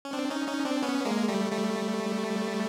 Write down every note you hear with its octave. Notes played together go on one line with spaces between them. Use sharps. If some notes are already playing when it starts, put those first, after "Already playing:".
C#4
C4 D4
C#4 D#4
C#4 D#4
C4 D4
B3 C#4
G#3 A#3
G3 A3
G3 A3